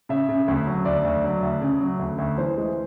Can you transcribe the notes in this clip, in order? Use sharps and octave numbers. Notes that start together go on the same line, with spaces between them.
C#3 E5
C#3
D2
F#3
D2 D5
D2
F#3
D2
C#3
F#3
D2
D2
E3 C5
G#3